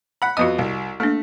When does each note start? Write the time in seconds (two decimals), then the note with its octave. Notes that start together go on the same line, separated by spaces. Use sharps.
0.22 F#5 B5
0.37 F2 B3 F#4 D#5 D#6
0.58 C2
1.00 A3 A#3 D4